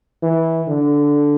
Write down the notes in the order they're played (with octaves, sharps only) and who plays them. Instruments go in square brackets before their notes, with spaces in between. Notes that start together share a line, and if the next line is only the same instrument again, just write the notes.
[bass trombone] E3
D3